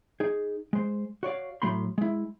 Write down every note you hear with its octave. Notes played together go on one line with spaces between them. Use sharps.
D#4 G#4
G#3 C5
F#4 C#5 D5 F5
A2 F#3 A3 B5 C6
G#3 E4